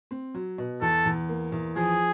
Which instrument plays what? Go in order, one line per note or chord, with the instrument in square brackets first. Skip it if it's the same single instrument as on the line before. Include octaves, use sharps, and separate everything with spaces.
[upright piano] C4
F#3
B2
[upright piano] E2 [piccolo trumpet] A4
[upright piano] E2
A#3
E2
[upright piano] F3 [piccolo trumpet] G#4